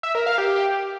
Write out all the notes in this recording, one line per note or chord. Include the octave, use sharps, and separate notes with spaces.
E5
A#4
F5
G4